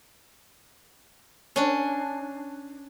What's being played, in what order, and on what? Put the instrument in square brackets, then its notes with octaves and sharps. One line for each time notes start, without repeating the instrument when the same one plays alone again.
[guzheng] C#4 D4